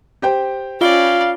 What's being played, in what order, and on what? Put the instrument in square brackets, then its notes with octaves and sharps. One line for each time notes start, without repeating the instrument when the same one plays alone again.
[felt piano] G4 C5 G5
[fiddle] C#4 D5 [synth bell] F4 G7 [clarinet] F5